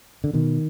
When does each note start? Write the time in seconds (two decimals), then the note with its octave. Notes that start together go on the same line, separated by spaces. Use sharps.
0.24 D3
0.34 B2 D#3